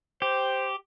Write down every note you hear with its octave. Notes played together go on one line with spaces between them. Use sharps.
G4 C5